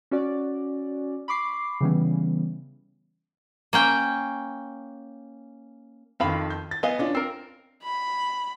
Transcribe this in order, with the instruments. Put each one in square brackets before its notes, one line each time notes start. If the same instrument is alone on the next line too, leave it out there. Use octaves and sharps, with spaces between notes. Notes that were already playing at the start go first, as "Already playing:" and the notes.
[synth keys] C#4 F#4 D5
B5 C#6 D6 C7
C#3 E3 G3 B3 C#4
[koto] A#3 C#4 G5
[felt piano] F2 D#3 [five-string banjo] F3 F5 B5
[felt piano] G6
A6
[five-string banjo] B3 D#5 F5 [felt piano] B4 G#5
[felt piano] C#4 D4 F4
[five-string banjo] C4 A#4 [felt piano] C7
[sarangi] B5